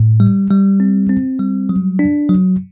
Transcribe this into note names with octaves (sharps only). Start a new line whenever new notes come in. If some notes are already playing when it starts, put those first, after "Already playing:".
Already playing: A2
G3
G3
C4
C4
G3
F#3
D4
F#3